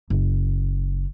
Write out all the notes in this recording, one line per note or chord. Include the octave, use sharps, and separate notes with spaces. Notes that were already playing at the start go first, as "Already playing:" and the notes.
F#1